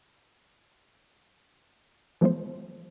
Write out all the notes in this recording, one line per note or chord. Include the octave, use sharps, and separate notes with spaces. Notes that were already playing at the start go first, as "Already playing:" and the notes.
E3 F3 G#3 A3 B3 C5